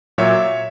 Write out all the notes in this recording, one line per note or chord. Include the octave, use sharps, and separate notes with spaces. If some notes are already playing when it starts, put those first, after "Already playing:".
A#2 F#3 C#5 E5